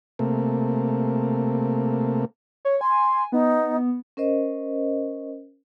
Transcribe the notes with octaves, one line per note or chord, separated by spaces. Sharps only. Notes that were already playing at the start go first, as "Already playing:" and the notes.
C3 A3 A#3
C#5
G#5 C6
B3 D#4
C#4 A#4 C5 D#5